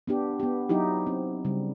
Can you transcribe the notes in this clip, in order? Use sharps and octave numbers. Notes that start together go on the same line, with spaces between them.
B3 D4 G4
B3 G4
F#3 D#4 E4 G4
C4
C#3 G3